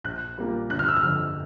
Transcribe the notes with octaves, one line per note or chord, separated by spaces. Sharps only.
A#1 F#6
A#2 G3 A#3
G1 F#6
F6
E6
F6
F2 D3